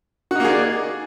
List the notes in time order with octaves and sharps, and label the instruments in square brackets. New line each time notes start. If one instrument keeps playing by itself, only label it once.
[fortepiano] F#4
D#4
A#3
G#4
D5